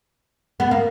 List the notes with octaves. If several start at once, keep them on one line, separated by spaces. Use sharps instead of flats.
B3
A#3